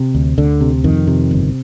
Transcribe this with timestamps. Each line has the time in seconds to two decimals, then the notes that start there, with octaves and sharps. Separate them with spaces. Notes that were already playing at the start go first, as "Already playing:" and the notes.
Already playing: C3
0.15 D2
0.38 D2 D3
0.61 C3
0.84 F2 D#3
1.07 C3
1.31 G1